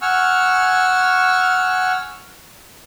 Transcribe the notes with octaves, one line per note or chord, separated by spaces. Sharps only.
F#5 G#5 C#6 E6 F6